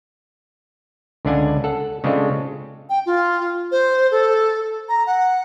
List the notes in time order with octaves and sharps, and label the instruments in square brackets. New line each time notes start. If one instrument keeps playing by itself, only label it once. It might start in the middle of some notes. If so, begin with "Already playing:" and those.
[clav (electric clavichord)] C#2 D3 C#4 D4 F#5 G#5
A4 F#5
C#3 G#3 C4 D4 F4 A4
[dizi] G5
F4
C5
A4
A#5
F#5